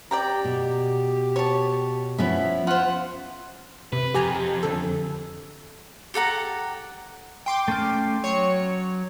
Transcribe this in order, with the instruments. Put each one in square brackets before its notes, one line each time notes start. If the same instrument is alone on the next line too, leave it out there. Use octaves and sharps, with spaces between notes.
[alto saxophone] G4 [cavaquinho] D5 G5 A#5
[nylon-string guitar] B2
[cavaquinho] C#5 A5
[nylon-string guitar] F3 B3 C#4 [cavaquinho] E4 E5
[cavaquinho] F4 C5 [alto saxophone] F#5
[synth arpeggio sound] C3 [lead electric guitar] B4
[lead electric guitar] F2 [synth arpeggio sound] G4 G#5 A#5
[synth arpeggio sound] D3 A4
[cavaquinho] G4 A4 F#5 A#5
[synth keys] G5 C6 D6
[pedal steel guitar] A3 C#4 F6
[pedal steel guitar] F#3 [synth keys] C#5